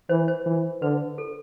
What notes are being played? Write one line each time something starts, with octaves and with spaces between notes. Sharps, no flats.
E3 C5
C5
E3
D3 B4
A4